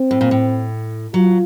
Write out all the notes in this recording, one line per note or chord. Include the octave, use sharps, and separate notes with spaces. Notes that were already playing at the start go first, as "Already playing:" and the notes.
Already playing: C4
A2
A#2
A2
F#3 F4